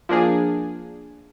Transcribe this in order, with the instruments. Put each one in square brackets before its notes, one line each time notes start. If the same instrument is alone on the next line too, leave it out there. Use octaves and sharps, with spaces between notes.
[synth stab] F3 A#3 D4 G#4